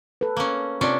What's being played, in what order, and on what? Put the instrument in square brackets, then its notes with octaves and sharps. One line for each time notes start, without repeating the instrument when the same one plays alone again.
[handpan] A4 B4
[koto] A#3 C#4
[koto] C3 C#4 D4 [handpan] F4 D5